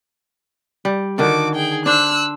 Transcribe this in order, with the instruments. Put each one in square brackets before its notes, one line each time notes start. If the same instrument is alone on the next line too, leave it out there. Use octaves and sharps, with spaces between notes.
[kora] G3
[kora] D3 D#3 A4 [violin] F#4 D6
[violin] G#4 G5
[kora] D4 C5 [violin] E6 F#6